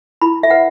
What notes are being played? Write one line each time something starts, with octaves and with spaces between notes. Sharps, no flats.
E4 B5
E5
B4 F#5